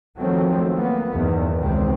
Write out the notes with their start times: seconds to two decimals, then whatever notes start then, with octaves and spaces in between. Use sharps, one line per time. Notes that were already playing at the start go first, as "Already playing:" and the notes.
0.18 D#3 F3 F#3 A3 C4
0.73 A#3 B3
1.13 E2 G2 D#3
1.59 C#2 C3 D#3 C4